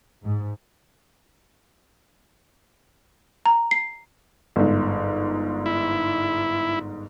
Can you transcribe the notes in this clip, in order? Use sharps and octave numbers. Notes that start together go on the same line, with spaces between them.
G#2
A#5
C7
G1 G#2
E4